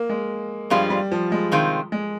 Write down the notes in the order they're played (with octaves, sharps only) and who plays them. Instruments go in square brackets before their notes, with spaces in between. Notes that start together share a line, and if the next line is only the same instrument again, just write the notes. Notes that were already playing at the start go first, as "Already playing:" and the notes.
Already playing: [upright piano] A#3
G#3
[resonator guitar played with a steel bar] G2 F3 G#3 F4 [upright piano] G3
[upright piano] G3
F3
G#3
[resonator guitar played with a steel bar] C3 D#3 G#3 C4 F4
[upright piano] G#3